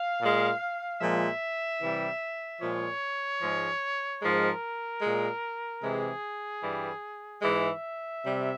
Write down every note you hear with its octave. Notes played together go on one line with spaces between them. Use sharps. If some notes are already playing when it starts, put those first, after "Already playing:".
Already playing: F5
A#2 G#3
A#2 F3 G#3 E5
C3 E3 G3
A#2 F3 G#3 C#5
G#2 F3 G#3
G#2 F3 G#3 A#4
A#2 G#3
C3 E3 G#3 G#4
G2 E3 G3
G#2 E3 G#3 E5
C3 G3